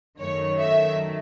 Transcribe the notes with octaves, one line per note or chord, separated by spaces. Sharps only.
F#2 D#3 F#3 A3 C#5
E5